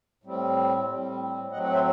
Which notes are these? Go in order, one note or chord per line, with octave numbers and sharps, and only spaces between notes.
A2 G3 C4
A2 G3 C4
A2 F#3 C4 D#5 F#5
F#5
C5 E5